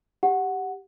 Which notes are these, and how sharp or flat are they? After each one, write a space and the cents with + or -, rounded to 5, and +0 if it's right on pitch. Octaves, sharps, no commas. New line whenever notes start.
G4 +0 F#5 +0